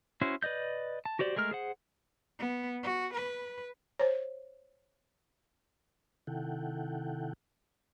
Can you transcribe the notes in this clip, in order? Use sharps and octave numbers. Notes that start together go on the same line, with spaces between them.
C#4 E4 F#4 C5
B4 D5 D#5 G6
A5
F#4 G4 C5 D5
G#3 A3 A#4 F6
G#4 C5 F#5
B3
F#4
B4
C5 C#5
C3 D#3 E4 A4 F#5 G5